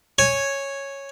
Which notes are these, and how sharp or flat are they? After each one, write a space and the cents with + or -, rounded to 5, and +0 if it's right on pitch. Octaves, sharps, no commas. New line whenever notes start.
C#5 -5 G#5 +0